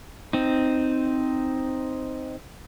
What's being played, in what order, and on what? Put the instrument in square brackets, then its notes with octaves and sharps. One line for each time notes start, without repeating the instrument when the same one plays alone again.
[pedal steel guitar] C4 D#4